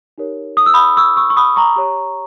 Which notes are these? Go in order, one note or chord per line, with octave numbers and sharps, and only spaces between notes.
D#4 G4 A#4 C#5
D#6
E6
B5 D#6
C#6 E6
C#6 E6
C#6
B5 D#6
A#5 C#6
G4 C#5